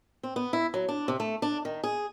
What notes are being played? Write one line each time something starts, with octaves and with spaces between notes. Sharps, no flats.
C4
B3
E4
F#3
D4
C3
A3
D4
D#3
G#4